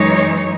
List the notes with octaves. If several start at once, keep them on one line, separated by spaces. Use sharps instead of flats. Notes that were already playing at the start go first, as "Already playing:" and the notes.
Already playing: F#2 E3 G#3 D#4 C#5